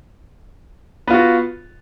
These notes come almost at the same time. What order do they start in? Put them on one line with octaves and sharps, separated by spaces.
B3 F4 F#4